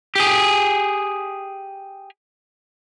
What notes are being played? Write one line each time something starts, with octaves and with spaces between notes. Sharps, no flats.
G4 G#4